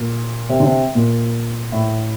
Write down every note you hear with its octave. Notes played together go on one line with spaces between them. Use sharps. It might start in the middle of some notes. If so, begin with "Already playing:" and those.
Already playing: A#2
C3
D3
C3
A#2
A2